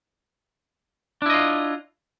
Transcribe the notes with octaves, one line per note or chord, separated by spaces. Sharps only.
D4 E4 F4 D#5